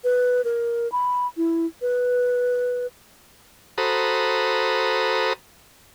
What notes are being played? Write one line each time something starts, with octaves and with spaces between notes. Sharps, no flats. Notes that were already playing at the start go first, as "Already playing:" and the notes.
B4
A#4
B5
E4
B4
F#4 A4 C5 A#5 B5 D#6